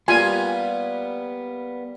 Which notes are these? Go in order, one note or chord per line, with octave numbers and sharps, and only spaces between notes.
G3 A#3 B3 F4 G#5